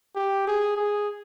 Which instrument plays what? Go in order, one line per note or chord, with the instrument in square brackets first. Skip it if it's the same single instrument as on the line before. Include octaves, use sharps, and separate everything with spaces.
[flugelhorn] G4
G#4
G#4